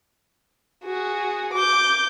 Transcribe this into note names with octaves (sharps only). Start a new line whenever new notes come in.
F#4 G#4
D6 G6